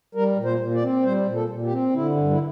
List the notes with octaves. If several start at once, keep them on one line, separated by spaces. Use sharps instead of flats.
G3 A#4
A#2
C5
A#2
D5
C4
G3 C5
A#2
A4
A#2
G4
C4
D3 E4
G2
E4